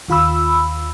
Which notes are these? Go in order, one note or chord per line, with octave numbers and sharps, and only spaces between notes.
D#2 F4 B5 E6